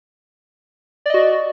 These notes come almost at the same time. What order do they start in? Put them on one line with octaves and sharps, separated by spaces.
D5 D#5 F#4